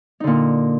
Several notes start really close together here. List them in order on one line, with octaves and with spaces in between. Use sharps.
D#4 D3 A#2